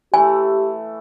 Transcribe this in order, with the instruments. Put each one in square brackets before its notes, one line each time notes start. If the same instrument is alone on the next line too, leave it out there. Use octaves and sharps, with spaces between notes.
[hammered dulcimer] E3 A3 [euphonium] G4 [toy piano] G#5